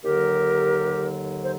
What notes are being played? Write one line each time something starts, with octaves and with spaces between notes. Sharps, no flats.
D#2 D3 F#3 G4 A#4
C5